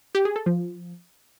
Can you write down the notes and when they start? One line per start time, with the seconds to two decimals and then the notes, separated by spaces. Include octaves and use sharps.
0.15 G4
0.25 G#4
0.36 A4
0.46 F3